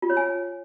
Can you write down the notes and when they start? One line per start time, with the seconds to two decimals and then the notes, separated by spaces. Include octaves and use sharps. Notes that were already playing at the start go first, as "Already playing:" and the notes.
0.02 F4
0.10 C#5
0.17 G#5